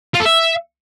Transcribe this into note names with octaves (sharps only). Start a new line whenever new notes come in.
F4
A4
E5